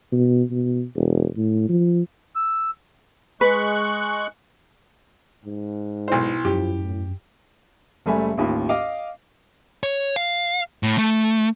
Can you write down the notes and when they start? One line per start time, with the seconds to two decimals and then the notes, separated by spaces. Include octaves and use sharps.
0.12 B2
0.51 B2
0.95 E1
1.37 A2
1.69 F3
2.36 E6
3.41 G#3 B4 C#6 F#6
5.45 G#2
6.08 B1 E4 C5
6.45 F#2 F3 G4
6.81 A2
8.06 F#1 G3 A3 E5 G#5 B5
8.38 A1 D#2 F4 B5
8.69 D#5 F5 D6
9.83 C#5
10.16 F5
10.83 A2
10.98 A3